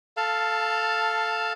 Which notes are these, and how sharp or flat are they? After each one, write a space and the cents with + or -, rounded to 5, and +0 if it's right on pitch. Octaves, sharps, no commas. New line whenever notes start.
A4 +0 F5 +0 A5 +15